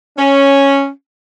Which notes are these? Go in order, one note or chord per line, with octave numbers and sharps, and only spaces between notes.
C#4